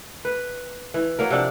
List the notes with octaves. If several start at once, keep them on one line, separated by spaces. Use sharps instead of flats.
B4
E3
F#3 A#3 A#4
C3 F3 D4 F#5